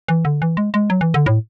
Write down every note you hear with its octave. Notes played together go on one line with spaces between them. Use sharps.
E3
D3
E3
G#3
G#3
F#3
E3
D3
A2